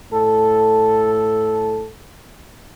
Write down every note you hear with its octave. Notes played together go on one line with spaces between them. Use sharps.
A2 A4